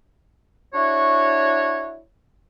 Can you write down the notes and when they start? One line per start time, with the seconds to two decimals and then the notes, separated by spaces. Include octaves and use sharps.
0.74 D4 E4 F#4 C#5